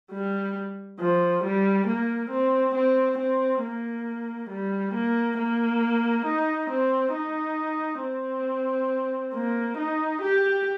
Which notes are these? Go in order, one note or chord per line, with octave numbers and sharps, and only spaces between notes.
G3
F3
G3
A#3
C4
C4
C4
A#3
G3
A#3
A#3
D#4
C4
D#4
C4
A#3
D#4
G4